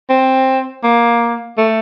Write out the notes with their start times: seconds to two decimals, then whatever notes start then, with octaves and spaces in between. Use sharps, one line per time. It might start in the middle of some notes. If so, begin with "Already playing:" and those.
0.10 C4
0.83 A#3
1.58 A3